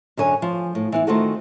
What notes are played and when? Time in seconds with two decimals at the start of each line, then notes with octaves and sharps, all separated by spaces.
0.17 F#2 D3 C#5 G#5
0.42 F3
0.75 A2
0.92 E3 B3 E4
1.07 D#3 A3 C4 F4 F#4 A4